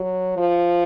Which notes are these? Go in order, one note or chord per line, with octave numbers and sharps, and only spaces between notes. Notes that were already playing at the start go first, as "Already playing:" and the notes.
Already playing: F#3
F3